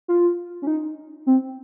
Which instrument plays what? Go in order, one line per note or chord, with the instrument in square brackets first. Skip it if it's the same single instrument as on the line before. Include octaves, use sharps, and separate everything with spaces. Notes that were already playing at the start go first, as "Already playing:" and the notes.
[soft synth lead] F4
C#4
D#4
C4